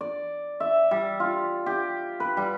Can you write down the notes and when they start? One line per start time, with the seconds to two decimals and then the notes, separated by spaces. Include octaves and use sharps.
0.01 D5
0.60 E5
0.91 G3
1.20 F4
1.66 G4
2.20 B4
2.37 G3